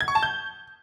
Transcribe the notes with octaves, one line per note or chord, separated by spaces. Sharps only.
G#6
C#6
A5
G6